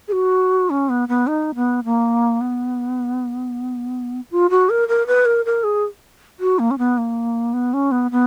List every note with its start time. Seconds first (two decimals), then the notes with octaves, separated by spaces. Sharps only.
0.08 G#4
0.12 F#4
0.70 C#4
0.89 B3
1.09 B3
1.27 D#4
1.55 B3
1.85 A#3
2.41 B3
4.31 F4
4.50 F#4
4.70 A#4
4.88 A#4
5.07 B4
5.26 A#4
5.45 A#4
5.64 G#4
6.40 F#4
6.59 A#3
6.71 C#4
6.78 B3
6.98 A#3
7.53 B3
7.74 C#4
7.92 B3
8.11 B3